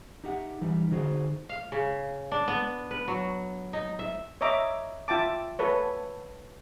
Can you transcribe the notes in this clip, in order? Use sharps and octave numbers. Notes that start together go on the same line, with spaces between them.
D#4 G4 F#5
E3 G3 D#4
D3 D#4 F#4 G#4 C5
F5
C#3
D4
B3
B4
F#3
D#4
E5
C#5 D#5 E5 A#5 D6
F4 E5 G5 A5 D6
A4 B4 C#5